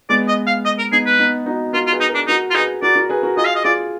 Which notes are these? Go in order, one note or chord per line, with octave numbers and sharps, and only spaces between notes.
G#3 B3 D5
D#5
F5
D#5
A#4
B3 D#4 G#4
B4
B3 D#4
D#4 F#4
F4 F#4 A#4
F4
G#4 B4
D#4
F#4 A#4
D4
D#4 F#4 A#4
F4
D#4 G#4 B4
F#4 A#4 D5
F#4 A#4
G#4 B4
F#4 A#4
F4 G#4 D#5
F5
D#5
F4 G#4 D5